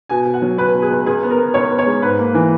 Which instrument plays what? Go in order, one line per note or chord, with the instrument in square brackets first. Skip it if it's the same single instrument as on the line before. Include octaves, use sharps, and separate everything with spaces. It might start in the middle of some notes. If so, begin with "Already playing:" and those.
[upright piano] B2 G#5
B2
F#5
F#3
C#2 B4
B2
G#4
C#2
C#2 G#4
B3
A#4
B3
C#2 C#5
B3
C#5
G#3
G#2 B4
A#3
E3